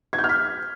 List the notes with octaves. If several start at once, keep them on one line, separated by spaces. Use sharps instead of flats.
G#6
G6
F6
B6